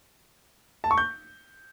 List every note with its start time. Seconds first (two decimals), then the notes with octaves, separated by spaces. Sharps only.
0.84 A5
0.91 C#6
0.98 G6